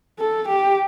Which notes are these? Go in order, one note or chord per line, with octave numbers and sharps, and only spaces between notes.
A4
G4